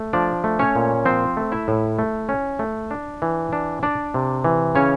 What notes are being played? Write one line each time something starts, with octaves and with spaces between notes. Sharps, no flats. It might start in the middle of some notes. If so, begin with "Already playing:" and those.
Already playing: A3
F3 D4 D5
A3
C#4 C#5
A#2
F3 C4 C5
A3
E4 E5
A2
A3
C#4
A3
D4
E3
D4
D4 D5
C3
E3
C#3 C#4 C#5